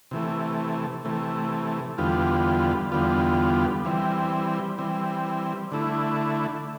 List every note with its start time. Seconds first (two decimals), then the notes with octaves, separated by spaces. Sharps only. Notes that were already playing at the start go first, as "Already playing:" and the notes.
0.11 C3 E3 A3
1.05 C3 E3 A3
1.98 E2 D3 G3 B3 F4
2.92 E2 D3 G3 B3 F4
3.85 E3 G3 C4
4.78 E3 G3 C4
5.72 D3 A3 E4